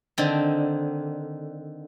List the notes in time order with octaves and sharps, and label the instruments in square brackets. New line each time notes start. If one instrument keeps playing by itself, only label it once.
[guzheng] D3 D#3 C4